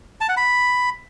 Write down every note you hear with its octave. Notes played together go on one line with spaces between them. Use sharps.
A5
F#5
B5